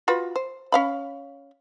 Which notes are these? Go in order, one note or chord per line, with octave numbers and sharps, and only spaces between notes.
F4 F#4 B4
C5
C#4 F5 B5